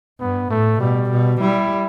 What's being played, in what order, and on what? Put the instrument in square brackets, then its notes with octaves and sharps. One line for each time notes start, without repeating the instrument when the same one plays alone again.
[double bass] G2 [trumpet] B3
[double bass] A2 [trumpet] A3
[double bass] B2 [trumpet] G3
[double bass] B2
[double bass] G3 [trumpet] E4